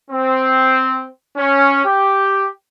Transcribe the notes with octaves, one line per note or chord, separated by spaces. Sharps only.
C4
C#4
G4